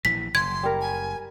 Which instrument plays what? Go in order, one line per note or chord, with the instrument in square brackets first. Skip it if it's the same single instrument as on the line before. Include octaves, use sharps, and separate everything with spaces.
[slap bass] A#1 E3 [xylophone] B6
[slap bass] F#1 [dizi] C6 [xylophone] G#6
[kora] G3 A#4
[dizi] G#5